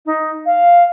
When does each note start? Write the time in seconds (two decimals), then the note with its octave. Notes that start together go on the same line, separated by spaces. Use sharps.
0.06 D#4
0.46 F5